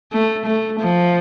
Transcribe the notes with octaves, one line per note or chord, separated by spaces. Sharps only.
A3
A3
F3